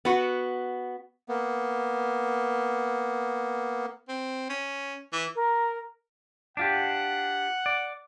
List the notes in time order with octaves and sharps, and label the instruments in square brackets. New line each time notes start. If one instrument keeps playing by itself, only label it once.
[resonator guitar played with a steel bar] B3 F#4
[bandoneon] A#3 B3
[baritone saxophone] C4
C#4
E3
[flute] A#4
[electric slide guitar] D4 F4 G4 [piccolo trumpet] F#5
[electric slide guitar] D5